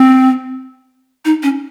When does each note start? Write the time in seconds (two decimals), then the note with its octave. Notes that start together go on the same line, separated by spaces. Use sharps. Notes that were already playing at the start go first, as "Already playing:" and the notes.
Already playing: C4
1.25 D#4
1.43 C#4